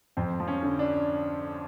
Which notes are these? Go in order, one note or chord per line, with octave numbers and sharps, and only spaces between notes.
F2 C4
F3
C#4
D3
D4